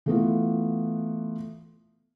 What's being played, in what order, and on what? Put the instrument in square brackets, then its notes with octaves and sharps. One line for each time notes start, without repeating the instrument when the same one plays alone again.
[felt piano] E3 A3 B3 F4